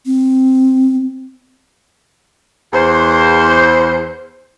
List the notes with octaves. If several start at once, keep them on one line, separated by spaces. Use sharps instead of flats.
C4
E2 C5